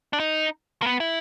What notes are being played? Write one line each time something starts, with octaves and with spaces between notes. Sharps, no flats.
D4
D#4
A#3
B3
E4